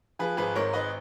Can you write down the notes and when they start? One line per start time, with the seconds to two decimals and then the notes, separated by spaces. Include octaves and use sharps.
0.19 F3 G#4 B4
0.37 G#1 G#4 B4
0.56 G#2 A#4 C#5
0.73 G#1 B4 D#5